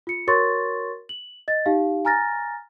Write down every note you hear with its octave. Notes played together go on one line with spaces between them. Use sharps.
F4 C#7
F#4 A#4 C#5 C6 C#6 A6
F#7
D#5 A6
D#4 G4 F5
G#5 A#5 F6 A6 A#6